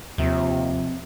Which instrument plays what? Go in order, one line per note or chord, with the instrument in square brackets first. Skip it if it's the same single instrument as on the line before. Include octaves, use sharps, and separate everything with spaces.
[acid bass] D#2 [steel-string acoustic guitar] C3 [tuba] F3